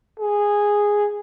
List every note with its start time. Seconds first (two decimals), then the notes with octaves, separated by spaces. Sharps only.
0.20 G#4